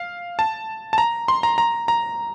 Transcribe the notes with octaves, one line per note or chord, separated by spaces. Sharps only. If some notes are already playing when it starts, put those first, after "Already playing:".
Already playing: F5
A5
A5
A#5
C6
A#5
A#5
A#5